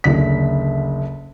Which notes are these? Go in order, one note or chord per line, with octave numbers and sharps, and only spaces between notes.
F#1 D2 D3 B6